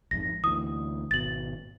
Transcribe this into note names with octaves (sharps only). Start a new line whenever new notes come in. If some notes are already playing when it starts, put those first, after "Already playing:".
A#1 F2 G#2 A#6
D2 E3 D#6
G#1 B2 A6 F#7